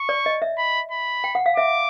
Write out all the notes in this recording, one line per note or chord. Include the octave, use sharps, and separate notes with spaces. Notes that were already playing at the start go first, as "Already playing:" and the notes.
Already playing: C#6
D5
D#5
E5
B5
B5
G5
F#5
F5
E5 D6